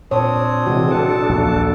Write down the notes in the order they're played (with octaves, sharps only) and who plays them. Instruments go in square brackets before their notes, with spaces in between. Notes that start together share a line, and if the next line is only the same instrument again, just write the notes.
[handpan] A#2 C#5 [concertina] C4 D4 D#6
[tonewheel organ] C3 E3 G#3 [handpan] F#4
[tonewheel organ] D4 A4 [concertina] A5
[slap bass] A#1 D#2